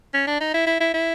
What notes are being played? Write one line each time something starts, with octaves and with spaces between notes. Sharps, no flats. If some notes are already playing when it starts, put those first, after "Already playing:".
C#4
D4
D#4
E4
E4
E4
E4